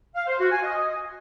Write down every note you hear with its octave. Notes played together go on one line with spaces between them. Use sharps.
F5
C5
F#4
G#5
D#5